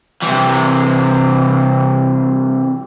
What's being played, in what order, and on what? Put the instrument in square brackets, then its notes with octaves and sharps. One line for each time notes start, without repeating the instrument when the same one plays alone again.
[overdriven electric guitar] C3 E3